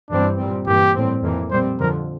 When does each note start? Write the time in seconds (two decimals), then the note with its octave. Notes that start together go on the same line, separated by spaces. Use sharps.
0.10 G2 E3 G3 C4 D4
0.38 A#2 G3 C4
0.66 G2 E3 A#3 G4
0.95 A2 G3 C4
1.22 F2 E3 A#3
1.51 A#2 G3 C4 C5
1.79 F2 D3 F3 A#4